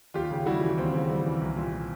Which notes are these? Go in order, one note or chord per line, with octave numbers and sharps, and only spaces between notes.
D#2 F4 G4
C#3
G3 E4 F#4
E3
D#2 C4
C#3
G3
E3
C2
A#2